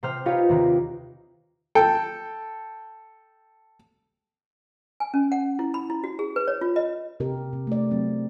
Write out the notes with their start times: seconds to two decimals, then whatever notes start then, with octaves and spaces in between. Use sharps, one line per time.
0.03 C3 C5 G5 F6
0.25 D#4 F4 G4 B4 C#5 F5
0.49 D#2 C3
1.75 A4 G5
5.00 G#5
5.14 C#4
5.32 F#5
5.59 E4
5.74 B5
5.90 E4
6.04 F#4
6.19 G#4
6.36 B4
6.48 C#5
6.61 F4
6.76 D#5
7.20 C3 G4 A#4
7.53 C3
7.67 A3 D5
7.91 F#3 C4